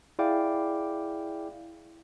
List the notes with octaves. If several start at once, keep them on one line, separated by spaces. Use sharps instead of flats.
E4 G#4 D5 F5 G5 D6